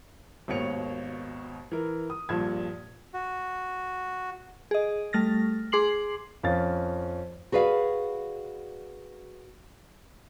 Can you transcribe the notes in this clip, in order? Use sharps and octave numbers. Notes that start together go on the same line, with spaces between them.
G#1 D#2 B2 C#5 C#7 F7
E3 A#4
D#6
A#1 G2 A#2 A5 G#6
F#4
G#4 D#5
G3 A3 F6 A6 A#6
G#4 C6 D6 C7 F#7
F2 C#4 F5 A6
F#4 G#4 B4 D5 F5